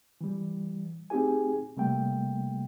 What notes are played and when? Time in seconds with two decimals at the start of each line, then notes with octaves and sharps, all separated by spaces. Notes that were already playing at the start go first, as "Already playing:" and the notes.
0.21 E3 G3
1.10 A3 C4 D#4 G4 G#4 G#5
1.77 C3 G3 A3 A#3 G5